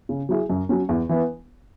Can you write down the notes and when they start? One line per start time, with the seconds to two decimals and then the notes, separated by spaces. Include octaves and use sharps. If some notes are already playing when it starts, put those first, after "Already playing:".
0.09 C#3
0.29 F#3 E4 G#4
0.50 F#2
0.69 F#3 C#4
0.89 E2
1.09 E3 B3